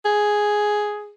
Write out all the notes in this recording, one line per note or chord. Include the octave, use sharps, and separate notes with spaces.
G#4